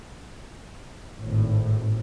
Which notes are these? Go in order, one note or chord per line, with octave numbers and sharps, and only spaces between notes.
G#1 A2